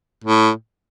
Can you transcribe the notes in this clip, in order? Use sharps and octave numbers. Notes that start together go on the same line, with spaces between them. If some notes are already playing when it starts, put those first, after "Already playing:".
A2